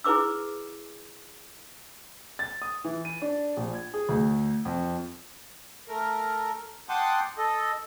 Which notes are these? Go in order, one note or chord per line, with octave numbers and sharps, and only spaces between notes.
E4 G#4 B4 D6 E6
A6
D#6
E3
D#7
D4
A#1
G#6
G#4
D2
F2
A3 A#4
F#5 G5 A5 C6 D6 D#6
A4 D#5